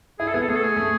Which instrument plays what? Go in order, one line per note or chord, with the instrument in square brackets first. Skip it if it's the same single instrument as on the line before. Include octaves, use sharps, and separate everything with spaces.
[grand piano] E4 [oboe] G#4
[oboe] A4
[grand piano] B3 [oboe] G#4
[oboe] A4
[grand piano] A3 [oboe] G#4
[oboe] A4
G#4
[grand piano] A3